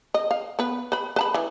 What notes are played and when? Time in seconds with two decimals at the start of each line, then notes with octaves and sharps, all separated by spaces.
0.14 D#5
0.31 F5
0.59 B3 B4
0.92 B4 B5
1.16 B4 A5 B5
1.34 E3